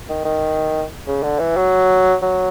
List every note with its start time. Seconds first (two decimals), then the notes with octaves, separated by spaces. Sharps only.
0.09 D#3
0.25 D#3
1.07 C#3
1.23 D3
1.39 E3
1.57 F#3
2.22 F#3